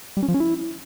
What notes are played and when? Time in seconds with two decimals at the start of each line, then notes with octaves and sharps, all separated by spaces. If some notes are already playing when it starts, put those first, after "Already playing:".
0.17 G3
0.23 C#4
0.28 F3
0.34 C#4
0.40 E4